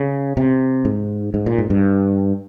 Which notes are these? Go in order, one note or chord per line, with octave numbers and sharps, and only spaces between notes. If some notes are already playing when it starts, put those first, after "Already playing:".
Already playing: C#3
C3
G#2
G#2
A#2
G#2
G2